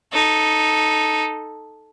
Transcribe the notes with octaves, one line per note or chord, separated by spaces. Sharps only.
D#4 A4